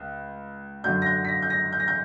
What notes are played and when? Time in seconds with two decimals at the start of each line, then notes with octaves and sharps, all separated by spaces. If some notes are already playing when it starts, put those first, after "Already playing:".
Already playing: C#2
0.84 F#2 D3 F#3 G6
1.02 A#6
1.06 G6
1.25 B6
1.29 A#6
1.42 G6
1.50 A#6
1.73 G6
1.80 A#6
1.88 G6